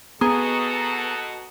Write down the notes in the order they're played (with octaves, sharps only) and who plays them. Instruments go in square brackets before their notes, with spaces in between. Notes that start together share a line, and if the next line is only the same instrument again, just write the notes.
[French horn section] B2 F#4 A4 [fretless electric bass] B3 [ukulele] G#4 [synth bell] A#5 D#6